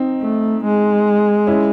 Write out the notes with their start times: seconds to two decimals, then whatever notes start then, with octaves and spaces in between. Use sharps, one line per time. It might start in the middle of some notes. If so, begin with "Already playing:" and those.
Already playing: C4 D#4
0.21 A3
0.64 G#3
1.47 C#4 E4